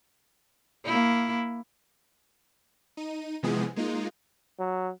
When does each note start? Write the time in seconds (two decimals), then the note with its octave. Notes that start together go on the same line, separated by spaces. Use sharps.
0.85 A#3 E4
2.97 D#4 D#7
3.43 C3 E3 F3 G#3 B3 G#4
3.76 G#3 A#3 D#4 F4
4.59 F#3